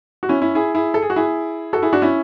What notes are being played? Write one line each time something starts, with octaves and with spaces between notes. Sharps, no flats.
F#4
C#4 E4
C#4 E4
E4 G#4
E4 G#4
A4
G#4
F#4
E4 G#4
F#4 A4
E4 G#4
D4 F#4
C#4 E4